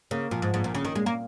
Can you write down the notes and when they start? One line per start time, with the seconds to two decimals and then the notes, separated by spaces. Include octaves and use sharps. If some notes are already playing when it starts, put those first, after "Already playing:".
0.11 C#3 A#3
0.31 A#2 F3
0.42 G#2
0.54 A#1 G#2
0.64 A#2
0.74 C#3 C#4
0.85 D#3
0.95 A#2 G#3
1.06 A#3